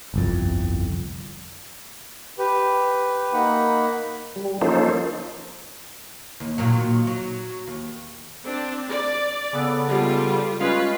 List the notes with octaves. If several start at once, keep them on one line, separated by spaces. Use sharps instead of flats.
G1 C2 F2
G4 B4
A#3 D#4 F#5 B5
G3
F3 A#3 C#4 D#4 A4 C5
D#2
A#2 D#3 F#3
F#3
D#2
C4 D4
D5
C#3 B3 A4
G3 G#3 F4
G#3 C#4 F4 B4 F5